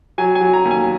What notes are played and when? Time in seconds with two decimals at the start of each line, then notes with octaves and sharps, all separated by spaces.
0.18 F#3 G#5
0.35 G#5
0.41 F#3
0.53 A#5
0.65 D#2
0.71 G#5